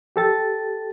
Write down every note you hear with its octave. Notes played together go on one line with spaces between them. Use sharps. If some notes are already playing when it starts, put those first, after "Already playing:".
G4 A4 A6